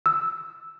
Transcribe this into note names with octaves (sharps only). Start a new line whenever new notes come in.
E6